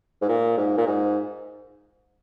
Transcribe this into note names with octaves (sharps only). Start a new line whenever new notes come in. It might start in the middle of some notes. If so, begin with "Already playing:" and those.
G#2
A#2
G#2
A#2
G#2